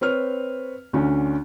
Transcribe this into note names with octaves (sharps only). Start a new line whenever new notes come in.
C4 B4 C#5 F6
D2 D3 C#4